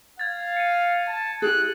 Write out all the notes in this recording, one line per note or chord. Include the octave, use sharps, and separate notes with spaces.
F5 G#6 A6
C#7 D#7
A5
E4 G4 G#4 F#6